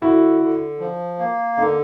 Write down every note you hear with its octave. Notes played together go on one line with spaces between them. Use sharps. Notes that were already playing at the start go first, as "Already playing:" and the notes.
D3 E4 F#4
D3
F3
A#3
D3 D#4